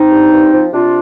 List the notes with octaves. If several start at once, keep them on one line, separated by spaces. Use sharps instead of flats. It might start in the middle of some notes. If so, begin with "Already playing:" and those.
Already playing: C4 D#4
G2
G2
F3
C3 D4 F4